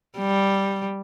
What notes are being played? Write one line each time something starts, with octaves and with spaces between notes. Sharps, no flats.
G3